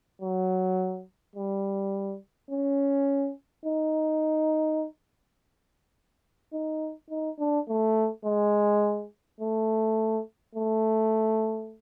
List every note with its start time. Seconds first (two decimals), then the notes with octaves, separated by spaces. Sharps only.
0.22 F#3
1.36 G3
2.51 C#4
3.66 D#4
6.53 D#4
7.10 D#4
7.39 D4
7.69 A3
8.25 G#3
9.41 A3
10.55 A3